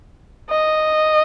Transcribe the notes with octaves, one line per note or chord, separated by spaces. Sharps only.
D#5